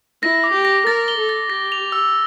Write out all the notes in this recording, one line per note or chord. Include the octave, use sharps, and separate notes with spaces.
E4 A#6
D6
G4
A#6
A#4 A6
G7
A4
A6
G4 A#6
F7
E6